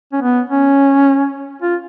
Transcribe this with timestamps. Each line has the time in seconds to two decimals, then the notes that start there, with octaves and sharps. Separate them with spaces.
0.13 C#4
0.22 B3
0.50 C#4
1.62 F4